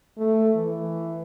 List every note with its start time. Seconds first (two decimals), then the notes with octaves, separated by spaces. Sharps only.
0.18 A3
0.55 E3